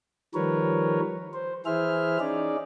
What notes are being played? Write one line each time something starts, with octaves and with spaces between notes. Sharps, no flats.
D#3 F3 G3 A#4 B4 C#5
C5
E3 E4 G#4 C5 E5 F6
C#4 D#4 G#4 D5